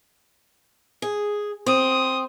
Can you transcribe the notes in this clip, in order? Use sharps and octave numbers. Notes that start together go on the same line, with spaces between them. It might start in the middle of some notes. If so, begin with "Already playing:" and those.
G#4
C4 D#6